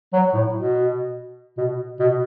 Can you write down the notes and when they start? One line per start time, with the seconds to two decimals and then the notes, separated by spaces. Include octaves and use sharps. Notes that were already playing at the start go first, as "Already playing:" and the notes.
0.13 F#3
0.33 A2
0.54 B2
1.57 B2
2.00 B2